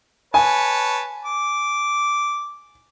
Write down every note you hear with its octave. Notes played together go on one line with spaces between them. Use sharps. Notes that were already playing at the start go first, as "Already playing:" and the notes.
B4 C#5 G#5 A5
D6